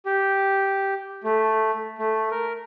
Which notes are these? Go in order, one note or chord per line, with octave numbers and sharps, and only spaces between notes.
G4
A3
A3
A#4